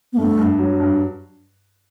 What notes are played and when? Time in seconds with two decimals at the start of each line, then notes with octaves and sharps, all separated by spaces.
0.13 B3
0.17 G2 A3
0.38 G2
0.59 F#3
0.80 G2